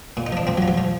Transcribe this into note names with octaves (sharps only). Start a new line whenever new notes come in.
A#2
D#4
F3 D4
F3 C4
F#3
F3
F#3
F3